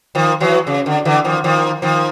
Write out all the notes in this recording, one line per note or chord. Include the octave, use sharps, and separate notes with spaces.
D#3 F3
E3 F#3
C#3
D3
D3 E3
D#3 F3
D#3 F3
D#3 F3